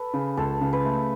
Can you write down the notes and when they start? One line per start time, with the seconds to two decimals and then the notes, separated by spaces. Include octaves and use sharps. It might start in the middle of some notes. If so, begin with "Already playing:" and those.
Already playing: A4 B4
0.14 C#3
0.37 C#2 A4
0.61 C#3
0.73 B4
0.85 A3